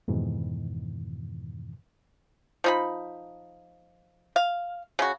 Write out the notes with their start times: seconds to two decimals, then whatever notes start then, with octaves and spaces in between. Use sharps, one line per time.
0.08 F2 G#2 B2 D#3 E3
2.64 F3 D#4 B5
4.36 F5
4.99 C#3 F#4